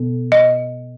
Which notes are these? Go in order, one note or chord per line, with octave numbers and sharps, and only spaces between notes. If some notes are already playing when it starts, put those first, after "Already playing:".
Already playing: B2 B3
D#5